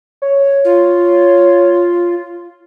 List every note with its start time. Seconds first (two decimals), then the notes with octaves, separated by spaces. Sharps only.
0.22 C#5
0.65 F4